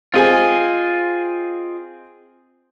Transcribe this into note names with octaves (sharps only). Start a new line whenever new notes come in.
C4 F4 G#4 D#5 G#5